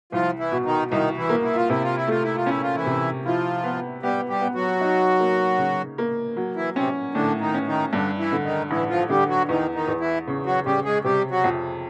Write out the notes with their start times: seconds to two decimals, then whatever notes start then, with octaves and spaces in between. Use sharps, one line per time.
0.12 C2 F3 F4
0.39 E3 E4
0.51 B2
0.65 D#3 D#4
0.91 C2 D#3 D#4
1.17 E3 E4
1.29 A#3
1.43 E4
1.56 F4
1.70 C3 E4
1.83 F4
1.96 E4
2.08 A3 F4
2.23 E4
2.36 F4
2.46 C#4 E4
2.62 F4
2.75 E3 E4
2.86 C3
3.25 F3 E4 F4
3.64 B3
4.02 G3 B3 G4
4.29 G3 G4
4.41 B3
4.55 F#3 F#4
4.81 D#4
5.20 A#3
5.58 C#3
5.98 A#3
6.37 F#3
6.56 E3 E4
6.75 C3 C4 C#4
7.14 A2 D3 D4
7.40 D#3 D#4
7.54 C#4
7.66 D#3 D#4
7.93 G2 D3 D4
8.18 E3 E4
8.32 D3
8.44 D#3 D#4
8.70 A1 E3 E4
8.90 F3 F4
9.10 D3 G3 G4
9.29 F#3 F#4
9.49 E2 D#3 D#4
9.75 D#3 D#4
9.88 E2
10.00 E3 E4
10.27 C#3
10.46 F#3 F#4
10.66 C#3 G3 G4
10.85 G#3 G#4
11.04 C3 G3 G4
11.30 F#3 F#4
11.44 F2